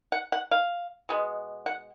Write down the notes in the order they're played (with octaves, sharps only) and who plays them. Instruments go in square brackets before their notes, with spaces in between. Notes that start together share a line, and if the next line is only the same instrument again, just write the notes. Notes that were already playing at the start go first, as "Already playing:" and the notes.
[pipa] F#5
F#5
F5
B2 G#3 B3
F#5